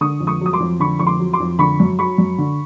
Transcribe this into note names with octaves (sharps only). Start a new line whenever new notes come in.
D3 C#6 D#6
F2
C#6 D#6
F#3 D#6
C6 D6
F2
D3 B5 C#6
F2 C#6
C6 D6
F#3
C6 D6
F2
D3 B5 C#6
F#2
F#3 B5 C#6
F#2
D3